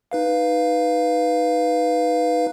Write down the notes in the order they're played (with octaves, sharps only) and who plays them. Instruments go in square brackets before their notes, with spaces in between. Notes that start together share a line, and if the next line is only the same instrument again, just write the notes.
[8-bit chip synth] D#4 B4 F5